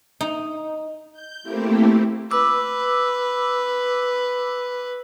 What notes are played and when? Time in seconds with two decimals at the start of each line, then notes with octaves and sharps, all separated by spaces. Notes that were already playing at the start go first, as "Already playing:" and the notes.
0.21 D#4
1.12 G6
1.43 A3 A#3 C4 E4 G4
2.31 B4 D6 E6